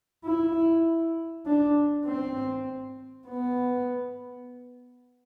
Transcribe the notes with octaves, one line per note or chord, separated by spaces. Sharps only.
E4
D4
C4
B3